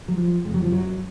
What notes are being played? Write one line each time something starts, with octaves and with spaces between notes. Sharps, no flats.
F#3
F3
F2 C3 G#3
F#3
F3
F#2 F#3